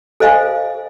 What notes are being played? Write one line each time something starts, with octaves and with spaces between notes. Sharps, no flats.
A4 C5 D#5 F5 G#5